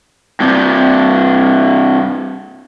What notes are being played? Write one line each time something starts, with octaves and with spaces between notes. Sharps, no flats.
G2 C3